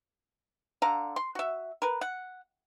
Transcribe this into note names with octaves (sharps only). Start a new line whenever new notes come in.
D3 F5 A#5
C6
F#4 E5
A#4 B4
F#5